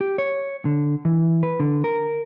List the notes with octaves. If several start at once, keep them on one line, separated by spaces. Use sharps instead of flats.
G4
C#5
D3
E3
B4
D3
A#4